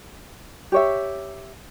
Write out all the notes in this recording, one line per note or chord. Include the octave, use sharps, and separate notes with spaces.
G4 C#5 E5